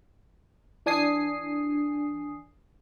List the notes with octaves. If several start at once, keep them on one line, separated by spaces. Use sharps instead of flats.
E3 D4 G#5 D#6 C7